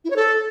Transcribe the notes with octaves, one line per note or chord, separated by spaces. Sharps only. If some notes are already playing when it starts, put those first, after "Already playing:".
E4
C#5
A4